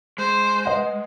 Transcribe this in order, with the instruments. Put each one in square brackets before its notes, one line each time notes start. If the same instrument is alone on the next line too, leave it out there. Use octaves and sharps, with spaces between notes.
[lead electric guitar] G#3 [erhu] C5
[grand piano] B4 D#5 F#5